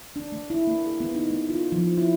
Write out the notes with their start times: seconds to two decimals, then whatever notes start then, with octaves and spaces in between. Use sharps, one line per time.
0.16 D4
0.32 A3
0.50 E4
0.67 A#3
0.86 G#4
1.00 B3
1.15 D#4
1.30 A3
1.50 F4
1.72 F3
1.98 E4